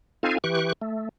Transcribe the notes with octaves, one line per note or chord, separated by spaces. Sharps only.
C4 D#4 F4 A4 F5 G#5
E3 G4 C#6 F#6
A3